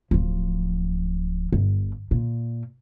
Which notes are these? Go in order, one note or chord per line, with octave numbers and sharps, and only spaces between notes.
D1 F3
G1
A#2